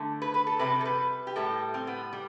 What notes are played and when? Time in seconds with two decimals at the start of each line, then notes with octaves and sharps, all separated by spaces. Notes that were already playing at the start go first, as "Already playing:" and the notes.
Already playing: D3 A3
0.22 B4
0.34 B4
0.47 A4
0.59 C3 G3 B4
0.81 A4
0.85 B4
1.27 G4
1.36 A2 G3 A4
1.74 C4
1.87 B3
2.13 G3